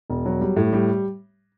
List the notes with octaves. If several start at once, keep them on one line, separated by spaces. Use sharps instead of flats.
E1
F#3
G3
A2
G3